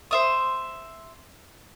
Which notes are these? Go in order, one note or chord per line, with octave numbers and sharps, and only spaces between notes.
C5 E5 D#6